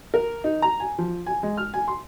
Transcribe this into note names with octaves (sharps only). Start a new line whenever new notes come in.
A#4
D#4
A#5
G#5
F3
G#5
G#3
F6
G#5
C6